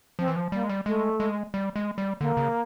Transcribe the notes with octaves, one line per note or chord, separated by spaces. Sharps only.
F3 C4
E3
F3
G3 A#3
G#3
G3
G#3 A3
G#3
G3
G#3
G3
D3 A#3
C#3